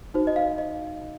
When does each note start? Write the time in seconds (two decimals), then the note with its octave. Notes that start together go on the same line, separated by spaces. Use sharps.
0.14 D#4 F#4 C5
0.27 D#5
0.36 F5
0.58 D#5